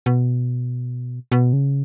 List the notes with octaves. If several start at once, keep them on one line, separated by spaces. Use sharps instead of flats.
B2
B2
C#3